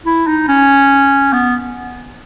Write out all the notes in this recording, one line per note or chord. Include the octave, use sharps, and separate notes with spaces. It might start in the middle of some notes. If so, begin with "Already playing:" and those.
E4
D#4
C#4
B3